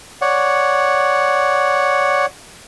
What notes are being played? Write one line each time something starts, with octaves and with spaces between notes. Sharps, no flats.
C#5 D5 F#5